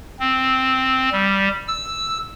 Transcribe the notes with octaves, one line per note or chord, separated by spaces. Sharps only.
C4
G3
E6